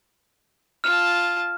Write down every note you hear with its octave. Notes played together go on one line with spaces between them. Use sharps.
F4 A5 F6